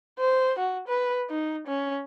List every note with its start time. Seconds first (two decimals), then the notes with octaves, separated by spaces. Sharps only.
0.19 C5
0.59 F#4
0.88 B4
1.30 D#4
1.67 C#4